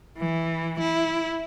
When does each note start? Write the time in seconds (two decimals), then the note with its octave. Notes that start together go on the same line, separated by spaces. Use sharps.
0.18 E3
0.80 E4